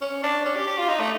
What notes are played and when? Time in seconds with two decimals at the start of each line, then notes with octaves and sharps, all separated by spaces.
0.01 C#4
0.23 D4
0.45 C#4
0.56 G4
0.67 G4
0.78 F4
0.89 D#4
1.00 A3